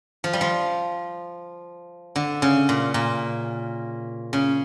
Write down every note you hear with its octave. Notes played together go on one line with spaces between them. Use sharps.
F3
G3
F3
D3
C#3
A#2
A#2
C#3